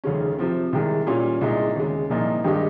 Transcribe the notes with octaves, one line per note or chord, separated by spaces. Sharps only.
F1 D#2 C#3 G#3 C#4
C3 F3 C4
C2 C3 D#3 G#3
A#2 G3 C#4 F4
C2 A#2 G#3 D#4
D#2 C#3 G#3
C2 A#2 F3 A#3 D#4
G2 D#3 G#3 D#4 G4